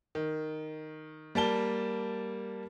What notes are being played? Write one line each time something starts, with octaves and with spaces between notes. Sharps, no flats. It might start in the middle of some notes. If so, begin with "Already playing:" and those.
D#3
G3 A#3 A5 G7